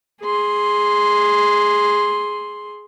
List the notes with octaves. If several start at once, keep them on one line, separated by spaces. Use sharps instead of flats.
G#4 C6